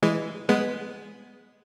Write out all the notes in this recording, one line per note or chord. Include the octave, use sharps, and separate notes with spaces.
E3 G#3
G#3 B3